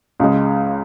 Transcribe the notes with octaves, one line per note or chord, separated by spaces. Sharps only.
C#2 C#3 G#3